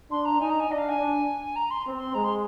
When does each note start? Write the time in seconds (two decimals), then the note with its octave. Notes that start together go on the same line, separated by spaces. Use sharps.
0.10 D4 C6
0.25 A#5
0.39 D#4 G#5
0.49 A#5
0.60 G#5
0.68 D4 D#5
0.78 F5
0.89 G#5
0.98 D4
1.56 A#5
1.70 C6
1.85 C4
1.98 C6
2.14 G#3 A#5
2.24 C6